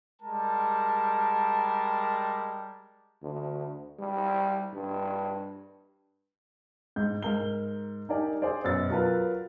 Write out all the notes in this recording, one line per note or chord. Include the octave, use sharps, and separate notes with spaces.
G3 G#3 A#4 A5
D2
G3
G2
G#2 G6
G#2 A#4 G7
D#4 G4 A#4 D5 G#5
G#4 C5 D5
F#2 B2 A6
F#3 F4 A#4 B4